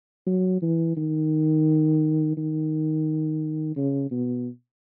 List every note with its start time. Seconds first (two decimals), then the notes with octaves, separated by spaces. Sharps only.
0.27 F#3
0.62 E3
0.97 D#3
2.37 D#3
3.76 C#3
4.11 B2